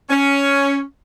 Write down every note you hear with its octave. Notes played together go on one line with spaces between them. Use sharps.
C#4